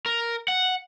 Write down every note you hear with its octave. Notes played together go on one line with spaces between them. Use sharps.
A#4
F#5